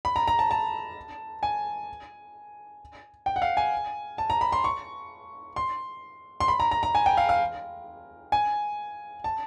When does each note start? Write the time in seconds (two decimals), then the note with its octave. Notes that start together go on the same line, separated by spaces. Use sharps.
0.05 B5
0.16 A#5
0.28 A#5
0.39 A5
0.51 A5
1.43 G#5
3.26 G5
3.36 F#5
3.42 F5
3.57 G#5
4.18 A5
4.30 A#5
4.41 B5
4.52 C6
4.64 C#6
5.56 C6
6.40 C6
6.48 B5
6.60 A#5
6.71 A#5
6.83 A#5
6.95 G#5
7.06 G5
7.17 F5
7.29 F5
8.32 G#5
9.24 A5